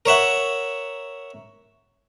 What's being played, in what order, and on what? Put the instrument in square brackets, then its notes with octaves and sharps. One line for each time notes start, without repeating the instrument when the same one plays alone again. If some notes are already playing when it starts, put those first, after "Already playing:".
[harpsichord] A#4 C#5 E5 F#5